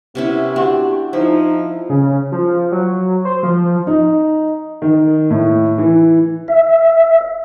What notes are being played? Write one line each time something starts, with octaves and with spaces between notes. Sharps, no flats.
C3 B3 C#4 E4
C4 D4 F#4 G4
F3 D#4 E4
C#3
F3
F#3
C5
F3
D#4
D#3
A2
E3
E5